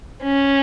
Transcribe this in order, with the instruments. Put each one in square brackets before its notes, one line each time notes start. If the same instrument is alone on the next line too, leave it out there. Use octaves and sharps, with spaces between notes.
[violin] C#4